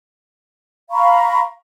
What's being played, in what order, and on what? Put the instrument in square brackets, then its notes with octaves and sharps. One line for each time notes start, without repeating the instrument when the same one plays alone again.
[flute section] F5 A#5 B5 C#6